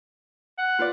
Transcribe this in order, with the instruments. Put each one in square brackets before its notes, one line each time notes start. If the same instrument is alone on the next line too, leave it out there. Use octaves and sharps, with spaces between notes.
[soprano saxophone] F#5
[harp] F4 B4 D5